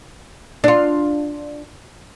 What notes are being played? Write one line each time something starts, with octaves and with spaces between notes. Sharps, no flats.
D4 F4